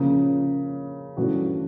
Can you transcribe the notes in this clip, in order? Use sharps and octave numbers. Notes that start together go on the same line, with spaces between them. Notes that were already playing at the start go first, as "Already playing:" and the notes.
Already playing: C#3 F3 A#3 C#4
G2 E3 A3 C#4 F#4